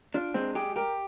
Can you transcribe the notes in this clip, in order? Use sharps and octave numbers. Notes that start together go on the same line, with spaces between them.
D4 F4
G#3 C4
G4 G#4
G4 A#4